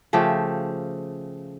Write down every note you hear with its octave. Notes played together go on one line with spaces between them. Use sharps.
C#3 F3 A3 G4